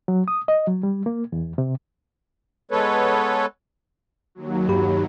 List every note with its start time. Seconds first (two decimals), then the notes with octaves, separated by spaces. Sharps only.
0.08 F#3
0.28 D#6
0.48 D#5
0.67 F#3
0.83 G3
1.06 A#3
1.32 E2
1.58 C3
2.71 G#3 B3 A4 B4 C#5
4.35 D#2 F#3
4.69 G2 G4 B5